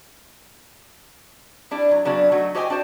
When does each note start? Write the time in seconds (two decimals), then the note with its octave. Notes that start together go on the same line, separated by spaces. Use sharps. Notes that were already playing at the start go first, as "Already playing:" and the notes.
1.71 G3 D4 E4
1.91 F#3
2.05 C#3 F#3 B3 D4
2.32 F#3 A3 D#4 F#4
2.55 F#4 G4 C5 D#5 G5 G#5
2.70 D4 F#4 C5 D5